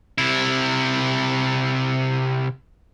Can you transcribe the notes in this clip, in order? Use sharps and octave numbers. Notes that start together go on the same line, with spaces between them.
C3 E4